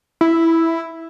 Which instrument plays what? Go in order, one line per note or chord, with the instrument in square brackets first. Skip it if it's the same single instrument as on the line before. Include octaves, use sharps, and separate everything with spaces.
[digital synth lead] E4